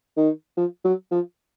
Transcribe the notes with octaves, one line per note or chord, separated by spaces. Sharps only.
D#3
F3
F#3
F3